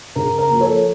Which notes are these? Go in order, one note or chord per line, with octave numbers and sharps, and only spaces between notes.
C#3 A#4
A#4
F3 A#3
A4 C#5